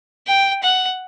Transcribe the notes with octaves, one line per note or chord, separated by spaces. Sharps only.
G5
F#5